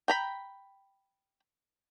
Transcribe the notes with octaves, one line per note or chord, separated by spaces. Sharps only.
G5 A#5 B5